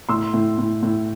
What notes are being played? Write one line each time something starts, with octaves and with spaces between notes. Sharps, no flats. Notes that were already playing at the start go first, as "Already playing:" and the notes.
A2 C6 E6
A2
A2
A2